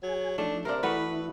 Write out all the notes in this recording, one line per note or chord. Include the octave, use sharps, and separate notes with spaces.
F#3 G#4 G#5
F3 A3 D4 D#4
C3 D4 A#4 C5 F5
E3 A3 B3 E4 F#4 B4